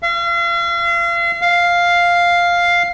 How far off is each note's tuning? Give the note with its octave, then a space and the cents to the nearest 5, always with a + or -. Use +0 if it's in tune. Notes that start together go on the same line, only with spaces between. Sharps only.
F5 -40
F5 +0